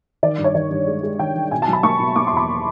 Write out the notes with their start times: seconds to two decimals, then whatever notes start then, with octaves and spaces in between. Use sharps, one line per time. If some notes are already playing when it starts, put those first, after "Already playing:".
0.23 D#3 D5
0.38 G2
0.44 C#5
0.55 D#3 D5
0.71 G2
0.87 G#3
1.03 G#3
1.19 D#3 G5
1.35 D#3
1.51 B2 G#5
1.62 A5
1.68 F#3
1.73 B5
1.83 A#3 C#6
2.00 B2
2.16 A#3 D6
2.27 C6
2.32 E2 B5